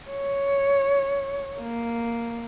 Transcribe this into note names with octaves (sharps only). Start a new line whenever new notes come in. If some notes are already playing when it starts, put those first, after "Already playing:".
C#5
A#3